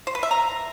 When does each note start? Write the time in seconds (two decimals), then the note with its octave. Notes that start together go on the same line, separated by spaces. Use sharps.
0.07 C5
0.15 B4
0.23 E5
0.31 A#5